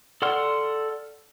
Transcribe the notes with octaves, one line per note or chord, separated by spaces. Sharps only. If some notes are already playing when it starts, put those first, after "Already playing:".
A4 D5 F#5 C6 F6